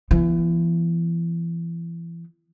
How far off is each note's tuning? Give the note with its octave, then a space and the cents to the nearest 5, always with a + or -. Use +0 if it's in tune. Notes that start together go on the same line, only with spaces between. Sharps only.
E3 +35 B3 -20